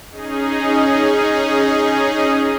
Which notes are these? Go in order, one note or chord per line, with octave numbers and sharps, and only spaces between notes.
C#4 D#4 G#4